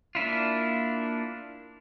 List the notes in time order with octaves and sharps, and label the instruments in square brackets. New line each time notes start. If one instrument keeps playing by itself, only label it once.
[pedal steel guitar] A#3 D4 E4 F4